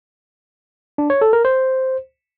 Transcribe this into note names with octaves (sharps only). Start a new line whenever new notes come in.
D4
C#5
A4
A#4
C5